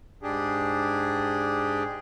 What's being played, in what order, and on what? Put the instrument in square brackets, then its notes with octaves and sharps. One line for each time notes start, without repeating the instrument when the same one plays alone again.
[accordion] G#2 D4 G4 G#4